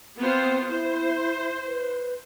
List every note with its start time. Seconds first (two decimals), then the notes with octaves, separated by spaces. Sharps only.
0.19 B3 C4 F4 C5
0.69 E4 C5
1.67 B4